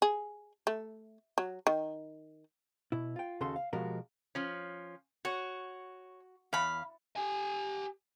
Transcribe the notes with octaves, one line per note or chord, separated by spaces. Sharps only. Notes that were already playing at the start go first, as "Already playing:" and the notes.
G#4
A3
F#3
D#3
B2 E4
F4 G5
D#2 C#3 F#4 A4 C6
F5
B2 F3 G#3 F#4 G4 A#4
F3 C#4
F#4 C#5
E2 F5 B5
G4 G#5